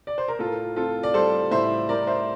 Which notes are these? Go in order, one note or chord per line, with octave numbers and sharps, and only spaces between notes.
D5
C5
A#4
A2 F4 A4
C4 F4 A4
D5
G3 A4 C5
A2 C5 E5
G3 A#4 D5
C5 E5